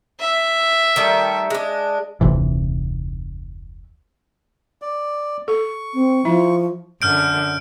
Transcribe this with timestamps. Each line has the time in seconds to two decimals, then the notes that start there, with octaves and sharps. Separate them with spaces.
0.20 E5
0.96 D#3 G3 A3
1.50 G#3 D4
2.21 F1 D2 C3 E3
4.82 D5
5.48 A4 C#6
5.94 C4
6.25 F3 E4 E5
7.02 F#2 D3 F6 G6 D7